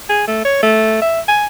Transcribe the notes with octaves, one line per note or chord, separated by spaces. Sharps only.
G#4
A3
C#5
A3
E5
G#5